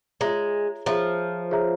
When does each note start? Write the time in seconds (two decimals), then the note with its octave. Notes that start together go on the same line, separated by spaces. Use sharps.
0.21 G#3 F4 G#4 C#5 E5 A#5
0.86 F3 F4 G#4 C#5 E5 A#5
1.51 F4 G#4 C#5 E5 A#5